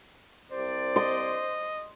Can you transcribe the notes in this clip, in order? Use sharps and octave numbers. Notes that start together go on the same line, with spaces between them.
C2 C3 C5 D5
D#5 C6